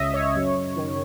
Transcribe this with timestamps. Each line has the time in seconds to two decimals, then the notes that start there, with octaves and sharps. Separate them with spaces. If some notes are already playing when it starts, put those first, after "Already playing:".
Already playing: C#2 C#3 D#5 E5
0.14 C#5
0.35 F#2
0.76 D#3